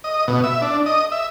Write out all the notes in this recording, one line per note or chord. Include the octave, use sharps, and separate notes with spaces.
D#5
B2
E5
D4
D#5
E5